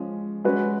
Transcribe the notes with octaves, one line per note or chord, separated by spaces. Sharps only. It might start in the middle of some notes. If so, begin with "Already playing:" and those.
Already playing: F3 G#3 C#4
G#3 C#4 F#4 B4